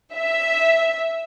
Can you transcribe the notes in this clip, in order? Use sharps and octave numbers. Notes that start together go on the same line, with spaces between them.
E5